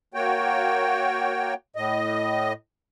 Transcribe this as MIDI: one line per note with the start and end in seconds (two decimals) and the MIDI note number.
0.14 1.54 58
0.14 1.54 66
0.14 1.54 73
0.14 1.54 79
1.76 2.53 45
1.76 2.53 75